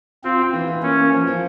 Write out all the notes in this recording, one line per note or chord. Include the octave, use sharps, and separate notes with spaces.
C4 F4
F4
E3
E3
A#3 C#4
A#3
F3
F3